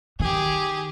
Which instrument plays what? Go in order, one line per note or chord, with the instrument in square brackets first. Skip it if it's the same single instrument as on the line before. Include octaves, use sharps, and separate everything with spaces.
[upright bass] D#3 [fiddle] G4 G#4